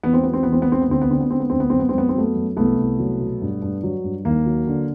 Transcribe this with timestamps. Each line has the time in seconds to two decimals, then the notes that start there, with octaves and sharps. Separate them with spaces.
0.03 E2 B3
0.14 C4
0.23 F#3 B3
0.33 C4
0.43 E2 B3
0.52 C4
0.62 B3
0.67 E2 C4
0.82 B3
0.88 D2 C4
1.02 B3
1.09 D3 C4
1.21 B3
1.30 D3 C4
1.40 B3
1.50 D2 C4
1.60 B3
1.70 F#2 C4
1.79 B3
1.89 C4
1.94 F#2 B3
2.09 C4
2.15 F#3 A3 B3
2.36 F#2
2.57 C2 A3 B3
2.77 C2
2.99 F#3
3.20 B2
3.42 G2
3.62 G2
3.83 F#3
4.04 G2
4.25 D#2 A#3
4.46 F#3
4.67 D3